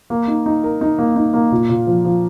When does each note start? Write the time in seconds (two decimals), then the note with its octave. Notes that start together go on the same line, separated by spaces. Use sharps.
0.10 A#3
0.28 D#4
0.46 D#4
0.64 A#4
0.81 D#4
0.99 A#3
1.16 D#4
1.34 A#3
1.51 A#2
1.69 A#2
1.87 F3
2.05 F3